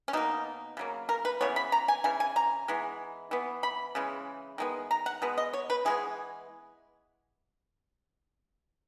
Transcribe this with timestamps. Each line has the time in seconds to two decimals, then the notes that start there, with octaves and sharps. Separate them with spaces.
0.08 C#4
0.13 B2 A#3 D#4
0.77 C#3 F#3 A#3
1.09 A#4
1.25 B4
1.41 C#3 E3 B3 C#5
1.56 B5
1.72 A#5
1.88 G#5
2.04 C#3 E3 G#5
2.20 G#5
2.36 A#5
2.68 E3 G#3 B3
3.31 E3 B3
3.63 B5
3.95 C#3 E3 G#3
4.58 D#3 G#3 B3
4.91 A#5
5.06 F#5
5.22 B2 G#3 B3
5.38 D#5
5.53 C#5
5.70 B4
5.85 E3 G#3 B3 G#4